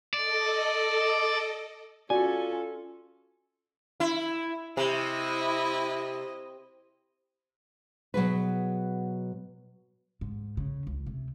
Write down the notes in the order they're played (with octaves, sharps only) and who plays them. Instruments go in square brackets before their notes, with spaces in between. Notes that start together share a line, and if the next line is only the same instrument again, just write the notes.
[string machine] A4 D#5 [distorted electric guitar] D5
[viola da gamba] C#4 A4 [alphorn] F4 [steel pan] F#4 D5 [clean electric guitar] G#5
[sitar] E4
[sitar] C3 [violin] E4 D#5
[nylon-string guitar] B2 F#3 G#4 B4
[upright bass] G#2
C#3
C#2
C3